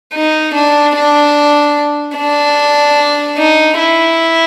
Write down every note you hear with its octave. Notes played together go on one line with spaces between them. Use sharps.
D#4
D4
D4
D4
D#4
E4